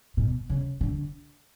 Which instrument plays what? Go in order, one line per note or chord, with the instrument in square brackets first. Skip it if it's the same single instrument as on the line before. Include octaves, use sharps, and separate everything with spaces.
[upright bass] B2
C#3
D3